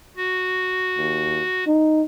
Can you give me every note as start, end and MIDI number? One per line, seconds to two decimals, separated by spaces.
0.17 1.64 66
0.98 1.43 39
1.67 2.04 63